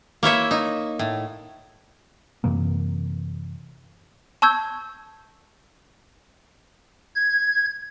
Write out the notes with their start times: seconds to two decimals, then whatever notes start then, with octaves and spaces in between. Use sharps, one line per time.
0.23 A#3 E4 C#5 E5
0.51 D#4
0.99 A2
2.44 F#2 C3 E3 A#3
4.42 A5 C#6 E6 G6 G#6
7.15 G#6